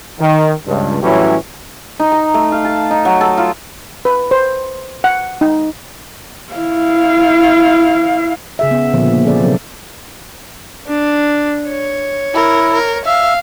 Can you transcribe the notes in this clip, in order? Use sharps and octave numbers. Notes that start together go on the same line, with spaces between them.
D#3
C#2 G2
A2 E3 F#3 G3 C#4 E4
D#4
A#5
A3
F5
A5
D#4
F#3
A4
F4
B4
C5
F#5
D#4
E4 F5
C#3 G#4 E5
B3
A#2 D3 F3 A#3 B3
A#3
F3 C#4 G#4 A4 C5 D5
C3 F#3 C4 D4 A4 A#4
D4
C#5
E4 A#4
A#4
E5 F5